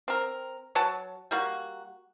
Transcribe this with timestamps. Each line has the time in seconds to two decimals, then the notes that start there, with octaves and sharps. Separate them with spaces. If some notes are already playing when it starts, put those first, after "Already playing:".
0.08 C4 A#4
0.75 F#3 C#5 F#5 A5
1.31 G3 A#3 F#4